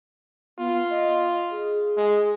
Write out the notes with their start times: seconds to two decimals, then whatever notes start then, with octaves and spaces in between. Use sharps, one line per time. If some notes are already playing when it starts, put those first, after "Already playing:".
0.59 B3 F4
0.90 D#5
1.51 G#4
1.97 G#3